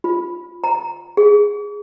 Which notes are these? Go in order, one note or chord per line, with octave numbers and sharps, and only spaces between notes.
F4
A#5
G#4